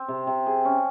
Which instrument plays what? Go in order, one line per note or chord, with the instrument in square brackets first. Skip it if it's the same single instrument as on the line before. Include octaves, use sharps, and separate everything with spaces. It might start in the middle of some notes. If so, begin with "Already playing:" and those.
Already playing: [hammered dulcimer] C4
C3
C3
G#4
C#4